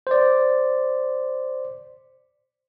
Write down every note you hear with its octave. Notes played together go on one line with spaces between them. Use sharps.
C5 D5